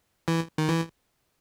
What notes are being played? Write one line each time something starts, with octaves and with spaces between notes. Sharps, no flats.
E3
D#3
E3